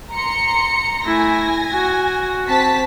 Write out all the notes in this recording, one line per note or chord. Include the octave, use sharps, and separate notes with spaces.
A#5 C6 C#7
A3 E4 G#5 A#6
F#4
C4 A5 B6